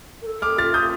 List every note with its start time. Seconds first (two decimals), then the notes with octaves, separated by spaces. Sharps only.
0.22 A#4
0.26 A4
0.42 A4 D6 F6
0.58 F4 F6 A6
0.74 D#6 G6